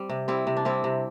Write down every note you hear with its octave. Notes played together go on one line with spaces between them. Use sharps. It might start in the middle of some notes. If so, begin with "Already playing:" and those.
Already playing: G3 C4
C3
G3 C4 E4
C3
D4
G3 C4 E4
C3